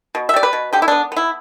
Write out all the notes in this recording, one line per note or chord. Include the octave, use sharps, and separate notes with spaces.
B2
E5
G3 D5
B4
B2
D3 G4
E4
B3 D4
B3 E4